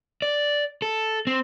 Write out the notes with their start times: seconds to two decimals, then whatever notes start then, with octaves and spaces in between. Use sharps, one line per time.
0.22 D5
0.82 A4
1.27 C4